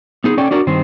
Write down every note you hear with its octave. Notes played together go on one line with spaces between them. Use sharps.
B3 D#4 G#4
C#4 A4 D5 G5
D4 F#4 A#4 D5 A#5
G2 D#3 C4